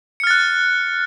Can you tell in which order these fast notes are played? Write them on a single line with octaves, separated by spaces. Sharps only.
C#7 F6 A6 F#6